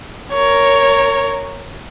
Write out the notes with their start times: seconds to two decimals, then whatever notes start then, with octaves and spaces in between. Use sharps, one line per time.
0.33 A#4 C#5